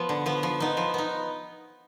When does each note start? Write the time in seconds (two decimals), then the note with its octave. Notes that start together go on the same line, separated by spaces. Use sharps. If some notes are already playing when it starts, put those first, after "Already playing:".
Already playing: F3 B3
0.09 D3
0.26 F3 B3
0.43 F3
0.60 B3 D#4
0.77 F3
0.94 B3 D#4